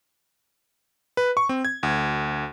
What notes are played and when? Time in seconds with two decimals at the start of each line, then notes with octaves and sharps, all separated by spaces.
1.17 B4
1.37 C#6
1.49 C4
1.65 G#6
1.83 D2